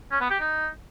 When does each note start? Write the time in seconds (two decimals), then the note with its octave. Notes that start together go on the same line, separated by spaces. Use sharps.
0.11 C#4
0.21 B3
0.30 G4
0.40 D#4